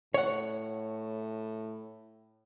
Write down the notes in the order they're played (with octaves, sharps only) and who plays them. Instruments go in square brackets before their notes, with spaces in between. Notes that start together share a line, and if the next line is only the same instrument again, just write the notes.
[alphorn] A2 [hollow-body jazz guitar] C#5 F#5